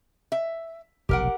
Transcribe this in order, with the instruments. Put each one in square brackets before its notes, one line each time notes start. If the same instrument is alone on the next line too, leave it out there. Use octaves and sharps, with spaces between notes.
[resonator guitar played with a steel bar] E5
[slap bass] F1 B1 [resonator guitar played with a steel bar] G4 A#4 F#5